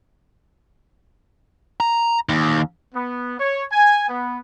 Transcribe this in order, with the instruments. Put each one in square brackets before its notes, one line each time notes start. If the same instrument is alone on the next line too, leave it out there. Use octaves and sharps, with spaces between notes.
[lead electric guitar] A#5
D#2
[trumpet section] B3
C#5
G#5
B3